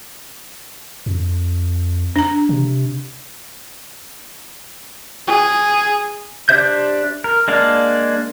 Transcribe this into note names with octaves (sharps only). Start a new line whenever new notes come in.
F2
D4 A#5
C3
G#4
D4 G4 C5 E5 G6
A#4
G#3 A#3 D4 F5